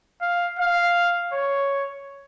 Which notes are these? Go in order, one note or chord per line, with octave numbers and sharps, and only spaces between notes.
F5
F5
C#5